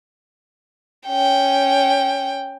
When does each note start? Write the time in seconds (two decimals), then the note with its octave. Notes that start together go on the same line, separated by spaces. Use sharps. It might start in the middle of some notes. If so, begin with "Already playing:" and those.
1.07 C#4 G5